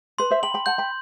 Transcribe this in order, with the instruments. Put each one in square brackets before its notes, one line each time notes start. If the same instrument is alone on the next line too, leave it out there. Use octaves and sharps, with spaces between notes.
[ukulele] B4 [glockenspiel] C6
[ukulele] C5 E5
[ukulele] G5 B5 [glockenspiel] F#7
[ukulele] G5 B5
[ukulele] F#5 A5 [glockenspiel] G6
[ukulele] G5 B5